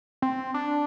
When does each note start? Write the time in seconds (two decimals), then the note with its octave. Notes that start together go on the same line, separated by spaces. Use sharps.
0.22 C4
0.54 D4